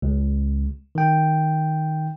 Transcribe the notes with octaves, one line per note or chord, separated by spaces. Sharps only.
C#2
D#3 G5